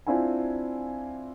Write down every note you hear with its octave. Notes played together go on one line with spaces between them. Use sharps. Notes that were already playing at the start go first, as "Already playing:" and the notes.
C4 D4 E4 F4 G#5